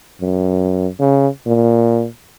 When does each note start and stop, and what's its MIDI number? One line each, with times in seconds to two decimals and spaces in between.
0.21 0.87 42
0.99 1.28 49
1.46 2.06 46